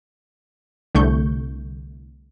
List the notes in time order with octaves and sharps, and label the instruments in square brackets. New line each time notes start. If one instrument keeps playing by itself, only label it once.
[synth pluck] C2 D3 A3 C#6 G6